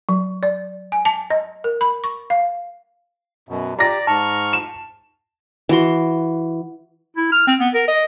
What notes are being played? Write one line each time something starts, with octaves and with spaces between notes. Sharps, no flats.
F#3
D5
G#5
A5
D#5
A#4
B5
C#6
F5
F#2 B2
G4 D5 A#5 A#6
G#2 A5 C#6 F6
E7
E3 F#4 C6
E4
F6
C4
B3
A#4
D#5